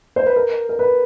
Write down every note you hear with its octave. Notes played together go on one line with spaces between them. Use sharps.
C5
B4
A#4
A#4
B4